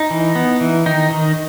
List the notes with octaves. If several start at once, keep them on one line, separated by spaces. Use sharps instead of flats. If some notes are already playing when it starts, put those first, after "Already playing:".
Already playing: D#4
E3
B3
E3
D#3 D#4
D#3